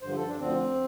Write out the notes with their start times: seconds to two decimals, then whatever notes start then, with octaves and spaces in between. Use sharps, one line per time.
0.02 G2 D3 F3 C5
0.15 A4
0.28 D4
0.39 D2 D3 F3 C4